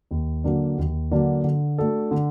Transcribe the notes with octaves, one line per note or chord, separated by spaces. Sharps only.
D#2
D3 F#3 A#3 D4
D#2
D3 F#3 A#3 D4
D3
A3 D4 F#4 A4
D3